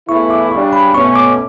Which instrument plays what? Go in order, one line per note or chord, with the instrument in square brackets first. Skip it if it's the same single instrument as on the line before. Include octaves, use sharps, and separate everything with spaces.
[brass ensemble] E2 C#3 E3 A3 E4 [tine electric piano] C#6
[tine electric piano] D6
[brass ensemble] C#3 G3 D4 [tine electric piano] C#6
[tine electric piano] B5
[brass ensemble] B2 A3 C#4 [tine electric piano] C#6
[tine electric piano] D6